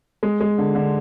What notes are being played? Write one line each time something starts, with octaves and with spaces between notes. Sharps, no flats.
G#3
G#3
D3
D3